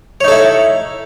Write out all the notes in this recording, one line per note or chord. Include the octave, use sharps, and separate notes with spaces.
D#4 E4 A4 C#5